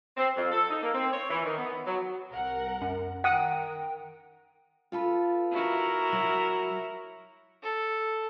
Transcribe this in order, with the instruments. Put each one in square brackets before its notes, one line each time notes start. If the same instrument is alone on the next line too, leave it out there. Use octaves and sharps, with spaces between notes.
[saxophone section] C4
F2
A4
D#4
A#3
C4
C#5
E3
D#3
B3
F#3
[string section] C2 A#4 F#5
[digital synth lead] F#2
[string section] D#3 A#4 [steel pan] F#5 D#6 [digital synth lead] G5
[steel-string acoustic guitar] F4 A4 B4
[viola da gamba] E4 F#4 A#4
[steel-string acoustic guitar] F#3
[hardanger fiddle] A4